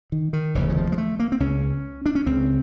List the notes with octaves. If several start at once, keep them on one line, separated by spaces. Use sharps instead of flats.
D#3
D#3
F1 D#2 C#3 E3
E3
F3
G#3
A3
A#3
C4
C#2 C#3 C#4
D4
C#4
C#2 C#3 C4